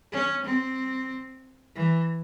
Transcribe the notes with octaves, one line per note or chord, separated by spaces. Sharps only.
C#4
C4
E3